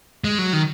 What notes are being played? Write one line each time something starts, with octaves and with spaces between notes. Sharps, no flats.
G#3
F#3
D#3